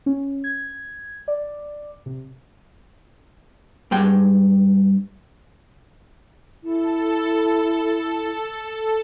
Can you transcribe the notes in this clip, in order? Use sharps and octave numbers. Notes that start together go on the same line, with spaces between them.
C#4
G#6
D5
C3
G2 G#3 G5
E4 A4